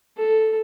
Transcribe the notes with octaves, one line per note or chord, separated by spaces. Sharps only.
A4